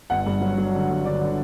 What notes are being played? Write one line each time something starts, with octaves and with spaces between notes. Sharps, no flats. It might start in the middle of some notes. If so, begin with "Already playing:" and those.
G1 F#5
G2
F#3
F#3
D3
G2
D3 D5
D3